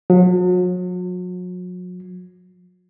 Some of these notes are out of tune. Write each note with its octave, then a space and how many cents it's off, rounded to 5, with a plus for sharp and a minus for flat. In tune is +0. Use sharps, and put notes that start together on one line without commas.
F#3 -40